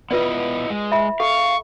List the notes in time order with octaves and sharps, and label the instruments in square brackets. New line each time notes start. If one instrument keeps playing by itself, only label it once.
[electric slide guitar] B3 E4 D#5 [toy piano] F4 B4 D5
[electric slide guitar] G#3
[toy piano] E5 B5
[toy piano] A4 [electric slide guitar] F5 [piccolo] C#6